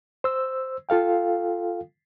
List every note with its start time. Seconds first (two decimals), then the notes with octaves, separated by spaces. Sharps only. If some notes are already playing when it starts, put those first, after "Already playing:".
0.24 C5 E6
0.89 F4 A4 F5 G5